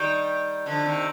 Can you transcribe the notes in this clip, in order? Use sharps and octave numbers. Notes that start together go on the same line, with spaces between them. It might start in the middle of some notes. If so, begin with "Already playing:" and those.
Already playing: D#3 G3
D3 F3
C3 D#3